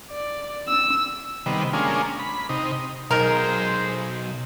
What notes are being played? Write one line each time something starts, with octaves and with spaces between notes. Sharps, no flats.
D5
E6
C3 D#3 G3 B3
G#3 A#3 C#4 D4 F4
B5
C3 D#4
B1 D#3 G#3 A#4 C5